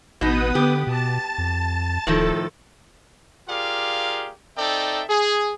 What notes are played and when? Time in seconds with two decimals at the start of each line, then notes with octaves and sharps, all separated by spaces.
0.21 A1 B2 B3 D#4 B4 D#6
0.55 D3 G4
0.87 B2 A5 A6
1.38 F2
2.07 D1 A2 D#3 F3 A4
3.49 F4 G4 G#4 A#4 D5 F5
4.58 C4 D#4 A4 D5 E5 G5
5.09 G#4